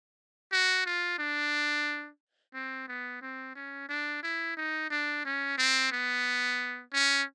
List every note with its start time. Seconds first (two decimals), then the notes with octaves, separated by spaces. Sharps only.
0.52 F#4
0.86 F4
1.19 D4
2.54 C4
2.88 B3
3.22 C4
3.55 C#4
3.89 D4
4.23 E4
4.57 D#4
4.90 D4
5.25 C#4
5.58 C4
5.92 B3
6.93 C#4